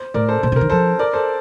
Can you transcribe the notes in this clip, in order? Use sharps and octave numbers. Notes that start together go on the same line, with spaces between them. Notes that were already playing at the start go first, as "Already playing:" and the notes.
Already playing: C5
A2 A#4 D5
A4 C5
A#2 C5
C3
D#3 A#4
F3 A4 C5
A#4 D5
A4 C5